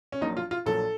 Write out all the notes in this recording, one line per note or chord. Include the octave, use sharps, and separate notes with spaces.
C#4
A#1 A#2 F#3 D#4
F4
F4
A#1 A#2 F#3 A4